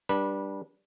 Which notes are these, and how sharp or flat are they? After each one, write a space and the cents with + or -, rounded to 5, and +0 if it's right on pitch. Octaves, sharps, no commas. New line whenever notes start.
G3 +0 D4 +0 B4 -25